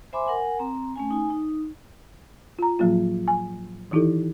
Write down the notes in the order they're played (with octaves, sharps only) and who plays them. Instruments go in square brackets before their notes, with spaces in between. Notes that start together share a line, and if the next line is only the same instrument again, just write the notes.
[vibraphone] C5 E5 G#5 B5 C6 D6
A#4 F#5 G#5
C4 A#5
A3 C#4 G#5
D#4 G#5
D#4
[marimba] F4 A#5
A2 F3 F#3 A#3 F4
G#5
D#3 E3 D#4 E4 G4 A4